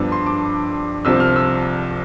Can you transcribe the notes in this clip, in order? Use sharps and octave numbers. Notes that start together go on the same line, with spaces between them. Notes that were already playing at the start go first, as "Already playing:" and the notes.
Already playing: G2 F3 B3 D4 E6
C6
D6
C2 C3 F3 C4 E6
F6
E6